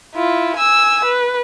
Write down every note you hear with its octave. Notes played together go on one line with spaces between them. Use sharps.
E4 F4
G#5 E6
B4